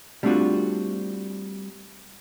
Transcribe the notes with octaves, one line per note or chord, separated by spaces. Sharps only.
G3 A3 C4 D4 F4 F#4